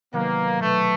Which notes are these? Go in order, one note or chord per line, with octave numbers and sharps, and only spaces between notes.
C3 D#3 F#3 A#3 B3
B2 A3